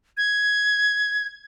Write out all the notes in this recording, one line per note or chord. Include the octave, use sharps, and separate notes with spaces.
G#6